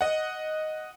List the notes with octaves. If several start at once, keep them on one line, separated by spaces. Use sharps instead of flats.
D#5 F#5